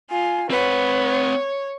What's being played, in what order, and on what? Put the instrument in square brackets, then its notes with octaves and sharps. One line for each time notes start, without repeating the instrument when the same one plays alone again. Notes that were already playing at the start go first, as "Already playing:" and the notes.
[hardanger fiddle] F4 [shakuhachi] G#5
[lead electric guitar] C4 F#5 [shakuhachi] B4 [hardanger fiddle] C#5